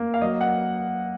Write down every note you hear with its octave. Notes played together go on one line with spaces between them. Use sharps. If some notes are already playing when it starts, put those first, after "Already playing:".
Already playing: A#3
F5
F#3 D#5
F#5